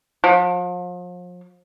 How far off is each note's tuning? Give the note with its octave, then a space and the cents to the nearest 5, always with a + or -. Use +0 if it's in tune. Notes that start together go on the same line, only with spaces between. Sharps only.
F3 +40